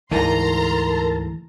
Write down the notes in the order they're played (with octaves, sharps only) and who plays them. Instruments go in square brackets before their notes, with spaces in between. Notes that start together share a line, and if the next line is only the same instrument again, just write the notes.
[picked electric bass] D2 G#2 [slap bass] E3 [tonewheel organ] A4 A#4 A5 [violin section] A#5 C6